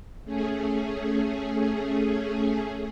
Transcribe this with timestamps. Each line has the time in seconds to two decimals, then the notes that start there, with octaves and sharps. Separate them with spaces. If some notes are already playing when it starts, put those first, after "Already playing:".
0.25 A3 C#4 G#4